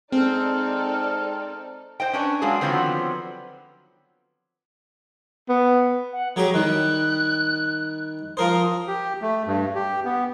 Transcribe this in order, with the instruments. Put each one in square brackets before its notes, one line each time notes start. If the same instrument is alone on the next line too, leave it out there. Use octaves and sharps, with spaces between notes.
[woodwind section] G#3 F6 [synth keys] C4 [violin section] D#4 A4 D5
[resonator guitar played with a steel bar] C5 D#5 G5
C#4 D4 B4 C#5
F#3 G#3 A#3 D4 G#4
D3 D#3 F3 F#3 B3 C4
[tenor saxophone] B3
[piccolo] F#5
[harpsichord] F#3 G4 G#4 [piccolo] A#5
[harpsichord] D#3 G3 [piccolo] F#6
[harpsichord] F3 A#4 C5 [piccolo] D#6
[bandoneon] G4
A3
G2
G4
B3